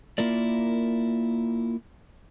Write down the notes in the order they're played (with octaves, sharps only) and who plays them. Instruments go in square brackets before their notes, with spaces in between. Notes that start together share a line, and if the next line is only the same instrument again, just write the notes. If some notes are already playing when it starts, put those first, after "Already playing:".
[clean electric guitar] A#3 E4 F4 A#4 D5